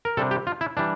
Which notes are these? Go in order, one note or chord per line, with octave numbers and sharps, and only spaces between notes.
A#4
C3 G3 D4 A4
G4
F4
E4
E3 G3 D4